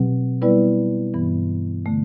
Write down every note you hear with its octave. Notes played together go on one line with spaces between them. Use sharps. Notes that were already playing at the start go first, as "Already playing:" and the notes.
Already playing: B2 F#3 C4 G4
G3 B3 E4 B4 D5
G2 E3 B3
D3 A3